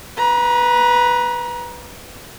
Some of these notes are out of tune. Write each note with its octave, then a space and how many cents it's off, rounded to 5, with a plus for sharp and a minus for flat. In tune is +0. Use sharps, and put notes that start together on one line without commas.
B4 +0 A#5 +30